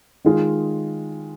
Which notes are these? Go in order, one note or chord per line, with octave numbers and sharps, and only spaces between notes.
D#3 G#3 F4 G#4